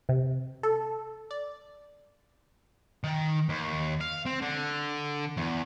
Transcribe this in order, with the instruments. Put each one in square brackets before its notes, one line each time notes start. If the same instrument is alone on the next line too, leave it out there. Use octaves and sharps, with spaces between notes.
[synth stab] C3
A4
D5
[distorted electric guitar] D#3
D#2
F5
C4
D3
E2